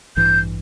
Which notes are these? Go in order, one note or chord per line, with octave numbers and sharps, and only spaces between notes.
A1 G2 E3 G6